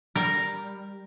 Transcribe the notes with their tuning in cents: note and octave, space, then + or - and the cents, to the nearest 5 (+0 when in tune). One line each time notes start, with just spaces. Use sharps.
G3 +0 A#4 +0